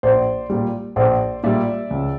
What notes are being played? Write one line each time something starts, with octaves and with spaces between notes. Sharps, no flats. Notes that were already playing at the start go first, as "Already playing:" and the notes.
A#1 C5 D5
A#2 G3
A#1 C5 D5
A#2 G3 D5 E5
C#2